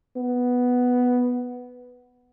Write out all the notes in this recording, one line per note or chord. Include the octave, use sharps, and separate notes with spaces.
B3